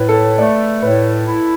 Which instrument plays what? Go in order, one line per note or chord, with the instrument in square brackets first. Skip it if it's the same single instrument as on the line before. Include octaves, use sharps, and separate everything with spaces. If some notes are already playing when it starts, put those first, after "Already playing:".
Already playing: [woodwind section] A2 [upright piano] B4
[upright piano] A4
[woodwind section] A3 [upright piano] D5
[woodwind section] A2 [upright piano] B4
[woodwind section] E4